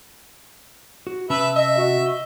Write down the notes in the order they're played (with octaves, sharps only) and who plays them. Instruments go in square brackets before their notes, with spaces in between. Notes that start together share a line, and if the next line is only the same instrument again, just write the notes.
[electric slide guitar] F#4
[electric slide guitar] C3 C#4 A5 [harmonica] B4 E5
[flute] D#5 [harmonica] E5
[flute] F#4
[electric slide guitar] D#5